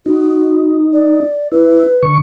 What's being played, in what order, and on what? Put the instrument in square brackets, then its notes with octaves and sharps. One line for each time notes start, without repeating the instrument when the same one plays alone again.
[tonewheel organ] D#4 [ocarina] F#4
[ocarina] D5
[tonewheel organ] E4 [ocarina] B4
[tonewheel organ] D3 C#6